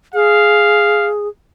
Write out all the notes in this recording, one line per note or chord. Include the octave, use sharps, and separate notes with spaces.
G#4 F5